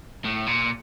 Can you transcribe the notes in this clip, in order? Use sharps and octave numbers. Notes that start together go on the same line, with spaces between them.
A2
A#2